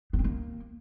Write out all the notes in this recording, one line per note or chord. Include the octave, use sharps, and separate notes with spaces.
B3
C4
A#3